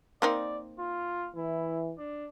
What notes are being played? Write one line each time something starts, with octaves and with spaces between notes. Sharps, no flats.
A#3 C4 D#4 D5
F4
E3 E4
D4